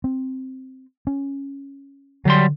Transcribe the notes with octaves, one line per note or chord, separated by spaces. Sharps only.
C4
C#4
D3 F#3 G3 C6